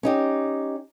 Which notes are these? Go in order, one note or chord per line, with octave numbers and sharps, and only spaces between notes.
C#4 D#4 G4